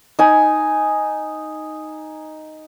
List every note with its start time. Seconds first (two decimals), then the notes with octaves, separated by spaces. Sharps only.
0.19 D#4 G#5